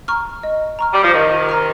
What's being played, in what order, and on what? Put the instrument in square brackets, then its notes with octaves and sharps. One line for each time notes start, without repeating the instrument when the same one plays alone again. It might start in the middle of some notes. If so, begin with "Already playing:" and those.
[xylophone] A#5 C#6 F6
D#5
A#5 C#6 F6
[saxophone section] G3
F3
[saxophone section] C3 D#3 [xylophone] D#5
[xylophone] A#5 C#6 F6